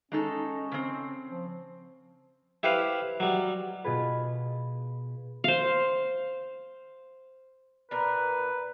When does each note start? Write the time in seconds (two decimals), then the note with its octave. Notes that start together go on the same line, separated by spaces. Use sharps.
0.12 G#3 C#4 D#4 A4
0.72 C#3 C4
1.29 F3
2.63 E4 G4 B4 C5 F5
3.20 F#3 G3
3.84 B2 F4 G#4 B4
5.44 C5 F5
7.91 A#2 A#4 B4